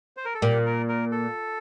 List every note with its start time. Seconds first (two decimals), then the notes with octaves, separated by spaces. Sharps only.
0.17 C5
0.25 A#4
0.34 A4
0.42 A#2 G4
0.66 A#4
0.89 A#4
1.11 A4